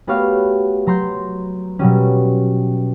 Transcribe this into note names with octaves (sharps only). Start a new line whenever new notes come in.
A3 B3 F#4 G4 C#5 F5
F#3 A#5 C6 G6
B2 F#3 G3 C#4